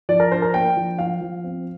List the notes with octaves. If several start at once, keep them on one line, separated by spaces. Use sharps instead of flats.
F3 D5
A#4
D4 C5
A#4
A#3 G5
F3
F3 F5
F3
C4